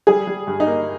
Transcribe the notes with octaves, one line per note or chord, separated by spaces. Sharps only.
G3 G#4
G3
G2
D#4
A#3